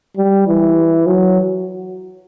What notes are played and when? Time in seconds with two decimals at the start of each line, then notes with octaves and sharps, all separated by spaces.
0.17 G3
0.47 E3
1.07 F#3